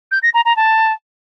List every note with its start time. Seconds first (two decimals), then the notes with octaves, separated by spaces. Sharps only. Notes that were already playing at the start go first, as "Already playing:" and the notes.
0.11 G6
0.23 A#6
0.34 A#5
0.45 A#5
0.56 A5